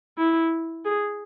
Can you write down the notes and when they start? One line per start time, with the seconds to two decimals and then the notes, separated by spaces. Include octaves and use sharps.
0.18 E4
0.85 G#4